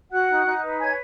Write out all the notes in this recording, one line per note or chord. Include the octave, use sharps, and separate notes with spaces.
F#4 F#5 F#6
D#4
D#4
B4
C#5 G#5 G#6